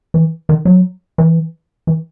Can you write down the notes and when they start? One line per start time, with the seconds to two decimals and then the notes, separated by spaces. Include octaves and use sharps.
0.14 E3
0.49 D#3
0.65 F#3
1.18 E3
1.87 E3